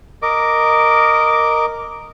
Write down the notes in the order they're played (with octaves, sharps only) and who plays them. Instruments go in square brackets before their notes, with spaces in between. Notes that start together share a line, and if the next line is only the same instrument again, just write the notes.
[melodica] A#4 D#5 D6